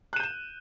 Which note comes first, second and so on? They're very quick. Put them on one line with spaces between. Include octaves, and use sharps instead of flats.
F#6 D#7 G6 E7